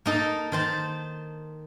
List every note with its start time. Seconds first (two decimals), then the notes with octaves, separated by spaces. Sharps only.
0.06 A#3 D#4 A4
0.52 D#3 C5 A5